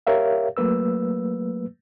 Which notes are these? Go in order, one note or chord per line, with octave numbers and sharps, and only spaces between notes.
G4 A#4 C#5 E5 F5
F#3 A3 A#3 B4 E6